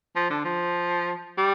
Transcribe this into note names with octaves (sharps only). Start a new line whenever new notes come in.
F3
D3
F3
G3